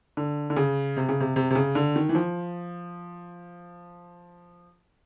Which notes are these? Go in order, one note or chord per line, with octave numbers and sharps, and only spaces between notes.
D3
D3
C#3
C3
C#3
C3
C3
C3
C#3
D3
D#3
E3
F3